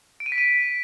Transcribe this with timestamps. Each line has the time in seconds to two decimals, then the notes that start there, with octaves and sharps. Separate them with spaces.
0.20 D7
0.26 D#7
0.32 B6
0.38 D#7